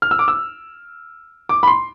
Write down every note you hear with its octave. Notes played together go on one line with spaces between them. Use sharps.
F6
E6
D6
E6
D6
B5
C6